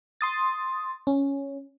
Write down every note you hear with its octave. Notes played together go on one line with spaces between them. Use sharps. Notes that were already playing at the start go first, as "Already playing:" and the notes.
C6 D#6 A6
C#4